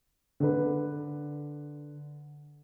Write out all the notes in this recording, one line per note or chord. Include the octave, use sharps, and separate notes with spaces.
D3 B4